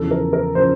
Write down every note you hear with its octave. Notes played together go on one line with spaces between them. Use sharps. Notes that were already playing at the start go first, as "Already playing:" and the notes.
Already playing: E2 C#3 F3 A4
A#4
A#4
C#3 F3 C5